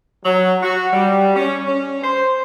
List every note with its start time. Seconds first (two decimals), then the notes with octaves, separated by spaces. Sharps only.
0.25 F#3
0.62 F#4
0.93 G3
1.36 C#4
1.67 C#4
2.03 C5